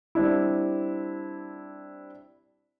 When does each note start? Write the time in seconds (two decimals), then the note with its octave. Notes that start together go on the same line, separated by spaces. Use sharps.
0.15 G3 C4 D4 E4